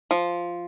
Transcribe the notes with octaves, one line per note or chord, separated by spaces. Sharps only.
F3